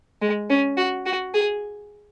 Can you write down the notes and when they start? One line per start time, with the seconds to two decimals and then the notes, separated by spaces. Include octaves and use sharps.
0.22 G#3
0.50 C#4
0.77 F#4
1.06 F#4
1.35 G#4